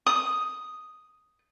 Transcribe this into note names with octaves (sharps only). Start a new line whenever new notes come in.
D#6